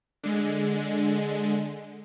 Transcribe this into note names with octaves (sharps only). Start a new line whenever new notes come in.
D3 G#3